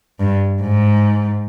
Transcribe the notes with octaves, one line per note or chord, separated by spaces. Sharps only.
G2
G#2